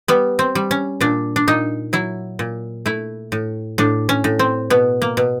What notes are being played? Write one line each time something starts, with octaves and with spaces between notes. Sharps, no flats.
G3 B3
C4
G3
C#4
A#2 D4
D4
A#2 D#4
F#3 E4
A#2
A3 E4
A2
A2 D4
C#4
A2
C4
B2 B3
A#3
B2